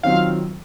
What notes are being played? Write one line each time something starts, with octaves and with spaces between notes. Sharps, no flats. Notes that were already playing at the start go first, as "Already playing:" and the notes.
D#3 F#3 C4 F4 F5